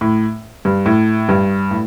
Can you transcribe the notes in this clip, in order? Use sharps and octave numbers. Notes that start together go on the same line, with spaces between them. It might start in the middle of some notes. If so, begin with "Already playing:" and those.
A2
G2
A2
G2
A2